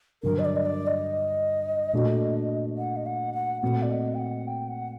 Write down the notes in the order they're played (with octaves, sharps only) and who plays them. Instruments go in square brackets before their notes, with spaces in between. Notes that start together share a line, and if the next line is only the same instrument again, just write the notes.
[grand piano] G2 D3 F#3 [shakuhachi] A#4
[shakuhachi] D#5
D5
D#5
D5
D#5
[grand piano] A#2 A3 D4 F#4
[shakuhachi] F#5
D#5
F#5
F#5
[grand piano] A#2 A3 C4 F#4 [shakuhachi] F#5
[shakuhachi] D5
D#5
G5
F#5
G5
F#5